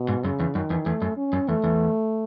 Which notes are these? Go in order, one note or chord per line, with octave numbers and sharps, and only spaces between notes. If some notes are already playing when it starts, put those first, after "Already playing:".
Already playing: B2
G#2
F#2 C#3
E2
F#2 D#3
E2
E2 A3
F#2
C#4
F#2
E2 A3
E2